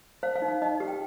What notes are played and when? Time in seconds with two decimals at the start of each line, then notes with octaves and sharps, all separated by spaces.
0.23 C5 F5
0.35 F5
0.42 D#4
0.48 F5
0.62 D#4 D#5
0.80 G4
0.88 G5